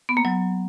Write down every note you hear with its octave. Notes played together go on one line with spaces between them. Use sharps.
B3
A#3
F#3